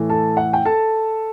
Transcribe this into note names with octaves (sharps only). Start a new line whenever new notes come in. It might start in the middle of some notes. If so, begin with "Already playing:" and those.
Already playing: A2 E3 A3
A4 A5
F#5
G5
A4 A5